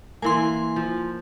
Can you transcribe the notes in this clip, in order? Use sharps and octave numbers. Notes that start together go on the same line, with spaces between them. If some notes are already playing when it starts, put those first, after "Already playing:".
E3 A#3 G#5 C6
F3